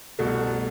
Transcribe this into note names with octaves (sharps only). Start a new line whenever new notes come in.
C2 B2 A3